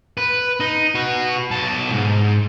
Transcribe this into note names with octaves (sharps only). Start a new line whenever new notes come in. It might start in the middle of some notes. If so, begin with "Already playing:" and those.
B4
D#4
F#4 B4
B1 A5
G#2